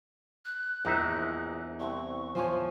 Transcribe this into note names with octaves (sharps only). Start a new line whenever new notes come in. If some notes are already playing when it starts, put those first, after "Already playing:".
F#6
A#1 E2 D#4 E5
C2 C4 C#6
F3 C5 C#5 G#5